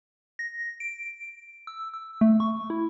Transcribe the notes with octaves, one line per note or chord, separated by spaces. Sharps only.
A#6
D7
E6
E6
A3
C#6
E4